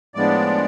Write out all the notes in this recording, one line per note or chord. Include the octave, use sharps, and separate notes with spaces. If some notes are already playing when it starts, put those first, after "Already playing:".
A2 F3 G#3 B3 D4 D5